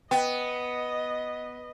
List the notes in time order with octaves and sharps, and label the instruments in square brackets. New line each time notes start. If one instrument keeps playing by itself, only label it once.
[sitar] B3 [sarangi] D#5 [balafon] G5